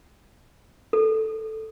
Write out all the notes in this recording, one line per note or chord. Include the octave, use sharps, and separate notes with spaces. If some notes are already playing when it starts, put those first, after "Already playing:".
A4